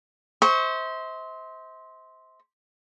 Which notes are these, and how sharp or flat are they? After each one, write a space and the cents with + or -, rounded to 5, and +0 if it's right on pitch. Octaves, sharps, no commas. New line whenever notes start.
C5 +0 E5 -45 C#6 +0